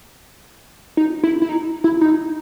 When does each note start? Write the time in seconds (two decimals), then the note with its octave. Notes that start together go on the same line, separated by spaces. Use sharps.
0.97 D#4
1.23 E4
1.42 E4
1.49 D#4
1.84 E4
2.01 D#4